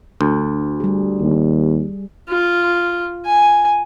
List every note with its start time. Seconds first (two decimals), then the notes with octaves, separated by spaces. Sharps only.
0.21 D2
0.80 G3 G#4
1.21 D#2
2.29 F4
3.26 G#5